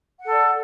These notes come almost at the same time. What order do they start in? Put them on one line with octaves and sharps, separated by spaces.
F#5 A4 D5